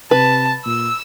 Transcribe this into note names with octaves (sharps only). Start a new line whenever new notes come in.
C3 B4 A5
A#2 E6